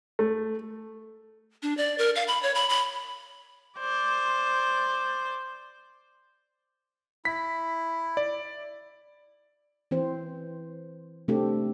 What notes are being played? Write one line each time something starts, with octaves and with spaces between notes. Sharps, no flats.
A3
D4
D5
A#4
F5
B5
C#5
B5
B5
C5 D5
E4 B6
D5
E3 C4 C5
C3 A3 C4 D4 G4 A4